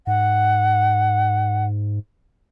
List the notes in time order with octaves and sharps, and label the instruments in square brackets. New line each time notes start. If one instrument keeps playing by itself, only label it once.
[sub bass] G#2 [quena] F#5